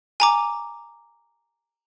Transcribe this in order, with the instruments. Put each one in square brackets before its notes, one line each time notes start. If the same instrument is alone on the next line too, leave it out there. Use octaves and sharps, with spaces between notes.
[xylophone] G#5 A#5 D6